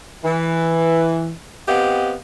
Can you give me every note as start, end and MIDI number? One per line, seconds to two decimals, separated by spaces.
0.24 1.33 52
1.68 2.15 59
1.68 2.15 60
1.68 2.15 67
1.68 2.15 75
1.68 2.15 77
1.68 2.15 78